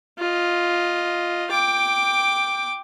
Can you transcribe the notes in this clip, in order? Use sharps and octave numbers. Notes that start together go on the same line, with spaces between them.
F4 D#5
G5 D6